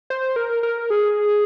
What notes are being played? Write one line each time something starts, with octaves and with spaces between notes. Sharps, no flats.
C5
A#4
A#4
G#4